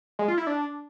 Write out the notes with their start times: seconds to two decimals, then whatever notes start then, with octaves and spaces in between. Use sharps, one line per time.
0.19 G#3
0.28 F4
0.38 E4
0.47 D4